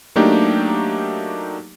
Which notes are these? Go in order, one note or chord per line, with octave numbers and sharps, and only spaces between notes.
F#3 A3 A#3 D4 D#4 G4